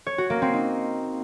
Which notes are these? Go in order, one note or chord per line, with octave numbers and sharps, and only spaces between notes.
C#5
F#4
A#3
C4
D#4